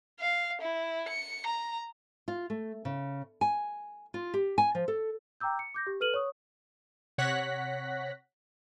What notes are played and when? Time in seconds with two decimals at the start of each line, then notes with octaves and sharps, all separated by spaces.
0.20 F5
0.61 E4
1.08 C#7
1.46 A#5
2.28 F4
2.50 A3
2.85 C#3
3.41 G#5
4.14 F4
4.34 G4
4.58 G#5
4.75 F3
4.88 A4
5.40 G5 A#5 D6 E6 G6
5.59 C#7
5.74 D6 G6 A#6
5.87 G4
6.00 A4 B4 F6 D#7 F#7
6.14 C#5 C#6 D#6
7.18 C3 C#5 F#5 F#6 A#6 B6